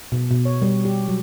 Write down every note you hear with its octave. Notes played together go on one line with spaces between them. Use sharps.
B2
B2
C#5
G3
G4
F#3